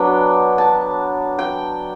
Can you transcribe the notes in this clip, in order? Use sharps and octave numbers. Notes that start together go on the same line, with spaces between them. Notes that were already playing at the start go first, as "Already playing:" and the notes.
Already playing: F#3 B3 D4 G5
A5
G5